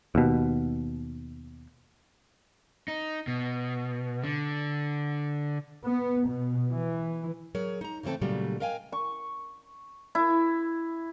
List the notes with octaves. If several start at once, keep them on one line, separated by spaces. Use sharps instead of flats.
D#2 B2
D#4
B2
D3
B3
B2
E3
F#3 G#4 A#4 C#5
D#4 A#5
C#3 E3 A3 C4 A4
A#2 C#3 F#3 G3 A3
A#4 D#5 F5 G5 G#5
C#6
E4